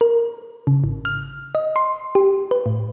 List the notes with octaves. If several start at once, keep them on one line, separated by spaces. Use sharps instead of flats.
A#4
C#3
G#1
F6
D#5
C6
G4
B4
A2